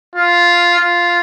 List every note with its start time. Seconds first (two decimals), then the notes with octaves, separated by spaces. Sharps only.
0.16 F4
0.79 F4